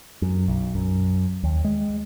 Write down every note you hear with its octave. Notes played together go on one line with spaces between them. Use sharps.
F#2
B1
F#2
D#2
G#3